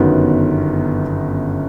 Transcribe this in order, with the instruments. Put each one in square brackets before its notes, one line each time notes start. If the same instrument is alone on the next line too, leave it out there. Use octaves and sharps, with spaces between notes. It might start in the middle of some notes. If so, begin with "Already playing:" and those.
Already playing: [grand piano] G1 F#2 D#3 F#3 B3